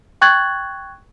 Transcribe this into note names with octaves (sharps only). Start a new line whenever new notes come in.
G5 C#6 F#6 G#6 A6 F#7